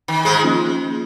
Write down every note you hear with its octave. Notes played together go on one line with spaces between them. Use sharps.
D#3
G#2 G#3
F3 A#3 C#4 F4